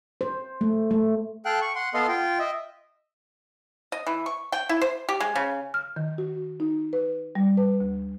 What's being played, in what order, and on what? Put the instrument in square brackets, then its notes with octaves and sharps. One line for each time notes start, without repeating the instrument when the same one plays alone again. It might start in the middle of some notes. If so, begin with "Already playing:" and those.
[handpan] C5
A3
A3
[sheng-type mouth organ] A4 F5 G5 F#6
C#6
F#5 C6
B3 A4 D#5 F5 C6
F4 G5
D#5 E5
[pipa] D#5
E3
C#6
G5
E4
C5
G4
G#3
C#3
[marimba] F6
D#3
F#4
D#4
B4
G3
B4
D2